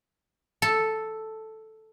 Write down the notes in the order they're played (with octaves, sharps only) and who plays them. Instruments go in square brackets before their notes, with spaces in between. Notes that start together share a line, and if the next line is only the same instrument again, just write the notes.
[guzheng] A4